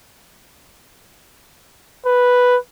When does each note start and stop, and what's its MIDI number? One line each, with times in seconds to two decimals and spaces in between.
2.06 2.56 71